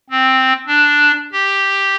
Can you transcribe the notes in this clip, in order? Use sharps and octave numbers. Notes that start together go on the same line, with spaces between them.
C4
D4
G4